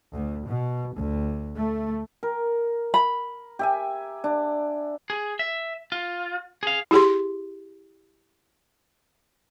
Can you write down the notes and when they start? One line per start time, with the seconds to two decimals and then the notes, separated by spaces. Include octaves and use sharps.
0.12 D2
0.48 B2
0.97 D2
1.55 A3
2.23 A#4
2.94 B5
3.59 G4 E5 G#5
4.24 D4
5.10 G#4
5.39 E5
5.92 F4
6.63 G#4 F5
6.91 E4 G4 G#4 C6